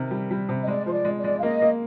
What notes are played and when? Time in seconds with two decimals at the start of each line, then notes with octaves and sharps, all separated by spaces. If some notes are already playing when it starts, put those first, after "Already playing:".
Already playing: C3 D#3 A#4
0.11 G3
0.31 G3
0.49 C3
0.62 D#5
0.68 G#3 D5
0.84 F3 C5
0.92 D5
1.05 G#3
1.18 D5
1.24 G#3
1.39 F5
1.43 A#3 D#5
1.62 A#3